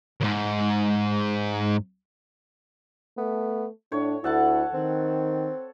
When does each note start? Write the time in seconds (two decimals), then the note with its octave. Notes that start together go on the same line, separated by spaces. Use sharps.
0.21 D#2 G#2
3.18 A3 B3
3.92 A2 D4 C#5
4.24 D2 E4 A4 F#5 A5
4.74 D#3 C4